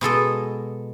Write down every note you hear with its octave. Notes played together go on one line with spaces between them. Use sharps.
B2 G#3 A4 D#5